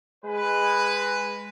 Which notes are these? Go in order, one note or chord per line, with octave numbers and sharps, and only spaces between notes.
G#3 B4